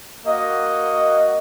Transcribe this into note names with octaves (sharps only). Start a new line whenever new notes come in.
A#3 F#4 D#5 F#5